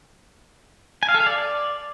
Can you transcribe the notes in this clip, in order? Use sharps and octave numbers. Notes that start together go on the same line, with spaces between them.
G#5
F5
A4
F5
D5